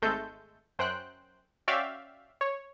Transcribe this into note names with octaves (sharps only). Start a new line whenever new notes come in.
G#1 G#3 A3 A4 G6
F#2 C5 G5 F#6
C#4 F#4 D5 E5 F5 G5
C#5